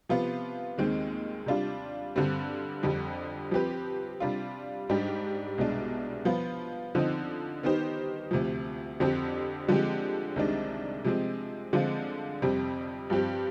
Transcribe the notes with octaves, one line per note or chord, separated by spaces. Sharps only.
C3 F3 B3 F4
D#2 D#3 G#3 C4
C3 G3 D4 F4
G2 D3 G3 C4
F2 D3 G3
F3 C4 G4 B4
C3 G3 D4 F4
G#2 G3 D4 G4
C2 B2 G#3 D4
F3 B3 F4
D3 F3 C4 D#4
D#3 B3 D#4 G4 C5
D2 C3 F3
F2 D3 F3 C4 G4
D3 F3 G#3 C4 G4
C2 C3 D#3 G#3 D4
C3 F3 G#3 C4
D3 F3 G#3 C4 F4
F2 C3 G3 C4
G2 F3 C4 G4